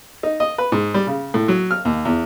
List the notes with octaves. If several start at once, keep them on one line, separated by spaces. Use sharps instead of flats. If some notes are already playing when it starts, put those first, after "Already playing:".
D#4
D#5
B4
G#2
G3
C#3
A2
F#3
F6
D#2
E2